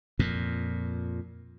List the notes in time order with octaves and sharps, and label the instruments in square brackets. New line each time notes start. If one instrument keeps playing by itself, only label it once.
[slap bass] F2 A#2